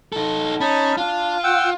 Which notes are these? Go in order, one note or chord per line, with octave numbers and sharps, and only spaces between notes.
D#4 A4
C#4 D#4 A5 B5
D4 F4
F#5 G5 E6